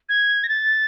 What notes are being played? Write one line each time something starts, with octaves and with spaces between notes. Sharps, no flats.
G#6
A#6
A6